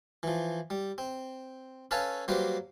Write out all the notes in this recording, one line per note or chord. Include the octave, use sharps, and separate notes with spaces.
E3 F3
G3
C4
C#4 A4 B4 C#5 F5 A5
F#3 G3 A#3 B4 C5